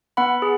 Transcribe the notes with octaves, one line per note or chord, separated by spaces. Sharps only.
B3 F#5 B5
G#4